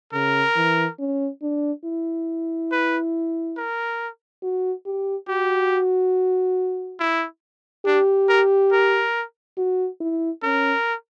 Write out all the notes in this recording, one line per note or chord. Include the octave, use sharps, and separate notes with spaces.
C#3 A#4
E3
C#4
D4
E4
B4
A#4
F#4
G4
F#4 G4
E4
D4 G4
A#4
A#4
F#4
E4
C#4 A#4